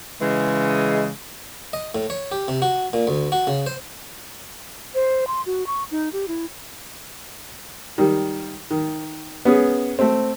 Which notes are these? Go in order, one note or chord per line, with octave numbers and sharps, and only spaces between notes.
C#3 E3 G#3
D#5
A2
C#5
G4
C3
F#4
A#2
D2
F#4
C#3
C5
C5
C6
F#4
C#6
D#4
G4
E4
D#3 G3
D#3
B3 C#4 G#4
A3 C4